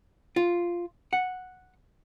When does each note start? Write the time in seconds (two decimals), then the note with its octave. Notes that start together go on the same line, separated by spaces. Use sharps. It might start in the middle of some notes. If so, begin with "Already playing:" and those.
0.36 F4
1.13 F#5